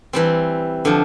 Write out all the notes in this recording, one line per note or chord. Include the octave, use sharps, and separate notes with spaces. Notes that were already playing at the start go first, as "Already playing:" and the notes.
E3 G3 C4
D3 F3